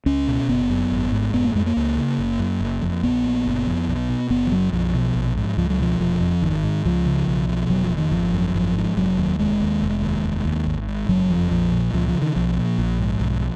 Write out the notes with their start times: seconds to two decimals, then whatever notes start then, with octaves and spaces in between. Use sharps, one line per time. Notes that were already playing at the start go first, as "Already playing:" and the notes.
0.06 C#2 C#4
0.27 B2
0.48 F#1 B3
0.70 F#2
0.92 G#1
1.12 G#2
1.34 F1 B3
1.44 A#3
1.55 F2 G#3
1.66 A#3
1.77 C#2
1.97 C#3
2.18 F#1
2.39 F#2
2.61 F#1
2.82 F2
3.03 A#1 B3
3.24 A#2
3.46 F#1
3.67 F2
3.88 B1
4.09 B2
4.30 F#1 B3
4.47 F3
4.51 F#2 F#3
4.73 B1 F3
4.94 B2
5.16 A#1
5.37 G#2
5.57 C#2 F3
5.70 F#3
5.79 B2 F3
6.00 F1 F3
6.21 F2
6.42 G#1 D#3
6.63 G#2
6.85 C#2 F3
7.06 C#3
7.27 B1
7.49 B2
7.70 F1 F#3
7.84 F3
7.91 F2
7.97 D#3
8.12 G#1 F3
8.34 F#2
8.55 G#1 F3
8.76 G#2
8.97 F1 F#3
9.18 D#2
9.39 F1 G#3
9.60 D#2
9.82 F1
10.02 D#2
10.24 F1
10.45 D#2
10.66 G#1
10.88 G#2
11.09 F#1 F#3
11.30 F2 F3
11.51 A#1 F3
11.72 A#2
11.94 C#2 F3
12.08 F3
12.14 C#3
12.22 D#3
12.36 B1 F3
12.58 A#2
12.78 A#1
13.00 G#2
13.20 B1